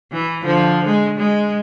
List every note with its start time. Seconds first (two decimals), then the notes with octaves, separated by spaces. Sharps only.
0.12 E3
0.42 D3 F3
0.86 G#3
1.18 G#3